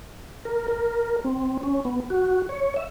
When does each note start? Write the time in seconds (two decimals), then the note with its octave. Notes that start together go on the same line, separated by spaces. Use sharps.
0.45 A#4
0.68 A#4
1.25 C4
1.63 C#4
1.85 B3
2.10 F#4
2.49 C#5
2.76 E5